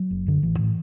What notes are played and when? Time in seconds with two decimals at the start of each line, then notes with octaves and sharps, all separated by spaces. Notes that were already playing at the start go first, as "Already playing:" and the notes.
Already playing: F#3
0.11 F#1
0.26 F#2 D3
0.42 A1 E3
0.59 A2